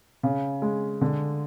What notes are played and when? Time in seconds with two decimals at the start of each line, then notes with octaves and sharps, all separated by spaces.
0.23 C#3
0.62 G#3
1.01 D3